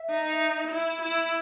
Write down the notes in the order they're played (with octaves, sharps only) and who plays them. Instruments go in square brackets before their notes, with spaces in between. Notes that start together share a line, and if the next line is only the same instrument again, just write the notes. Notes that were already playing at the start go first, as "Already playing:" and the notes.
Already playing: [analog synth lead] E5
[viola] D#4
E4
E4